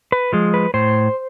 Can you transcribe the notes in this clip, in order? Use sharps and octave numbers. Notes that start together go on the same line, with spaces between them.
B4
F3 G#3
B4
A2 C5